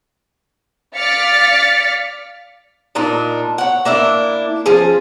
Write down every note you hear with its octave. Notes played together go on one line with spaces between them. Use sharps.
D5 F5 F6 A6 B6 C#7
A#2 D4 D#4
C#5 F#5
A#3 D4 E4
F3 C#4 G#4